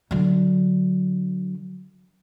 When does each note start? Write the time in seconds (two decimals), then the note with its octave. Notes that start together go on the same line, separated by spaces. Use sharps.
0.11 D3 F#3